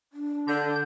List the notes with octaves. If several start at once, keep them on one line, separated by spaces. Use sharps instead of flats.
D4
D3 G6